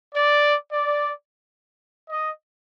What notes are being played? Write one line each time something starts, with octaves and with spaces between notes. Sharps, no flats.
D5
D5
D#5